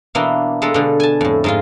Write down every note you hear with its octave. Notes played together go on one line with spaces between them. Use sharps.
B2 E3 A#3 D4 E4
G#3 A#3 D4 A4
B2 D3
G#5 A5
F2 A2
G#2 G#3 F4